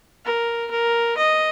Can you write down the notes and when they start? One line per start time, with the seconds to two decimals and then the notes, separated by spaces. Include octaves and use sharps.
0.25 A#4
0.71 A#4
1.17 D#5